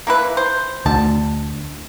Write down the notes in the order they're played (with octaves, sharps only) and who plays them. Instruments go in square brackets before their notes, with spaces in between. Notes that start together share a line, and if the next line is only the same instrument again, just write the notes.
[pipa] A#3 E4 B4
C5
[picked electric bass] D2 [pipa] A5